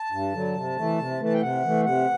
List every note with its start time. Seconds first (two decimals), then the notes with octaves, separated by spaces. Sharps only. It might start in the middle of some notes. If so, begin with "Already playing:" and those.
Already playing: A5
0.12 G2
0.34 D3 F#3
0.55 C3
0.77 E3 A3
0.98 C3
1.20 E3 A3 A5
1.33 G5
1.41 C3 F#5
1.63 E3 A3
1.85 C3 F#5